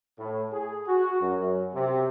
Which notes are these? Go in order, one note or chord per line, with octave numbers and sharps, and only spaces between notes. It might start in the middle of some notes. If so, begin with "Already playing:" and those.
A2
G#4
F#4
F#2
C3